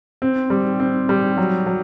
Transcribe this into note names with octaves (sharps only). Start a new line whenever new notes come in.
C4
G3
C4
G3
F#3
F#3